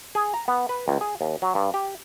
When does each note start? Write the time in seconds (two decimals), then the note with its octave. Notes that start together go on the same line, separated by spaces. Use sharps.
0.15 G#4
0.34 A#5
0.48 B3
0.69 B4
0.88 C#2
1.01 G#4
1.21 D#2
1.42 F#3
1.55 G2
1.74 G4